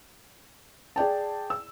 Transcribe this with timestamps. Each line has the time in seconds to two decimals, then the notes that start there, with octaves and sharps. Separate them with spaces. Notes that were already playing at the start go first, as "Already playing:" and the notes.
0.96 G#4 D5 G5 A5
1.50 E6